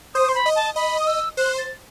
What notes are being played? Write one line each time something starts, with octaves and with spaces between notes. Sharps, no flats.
C5 D#6
C6
B5
D#5
A5
D#5 B5
D#6
E6
C5 F#6
A6